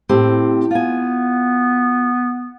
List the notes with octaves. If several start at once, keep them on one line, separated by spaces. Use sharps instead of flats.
A2 C4 G4
B3 F4 G#5